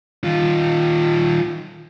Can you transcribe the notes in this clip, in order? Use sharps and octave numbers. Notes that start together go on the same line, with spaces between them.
D#3 F4